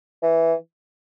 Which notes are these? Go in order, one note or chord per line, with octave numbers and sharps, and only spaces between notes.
E3